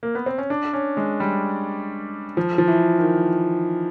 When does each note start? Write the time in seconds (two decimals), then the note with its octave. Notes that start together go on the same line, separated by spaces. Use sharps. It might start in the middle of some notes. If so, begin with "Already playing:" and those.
0.03 A#3
0.15 B3
0.26 C4
0.38 C#4
0.50 D4
0.73 C#4
0.97 G#3
1.20 G3
2.37 F3
2.58 F3
2.68 E3
2.98 D#3